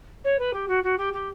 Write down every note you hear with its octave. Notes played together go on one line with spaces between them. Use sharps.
C#5
B4
G4
F#4
F#4
G4
G4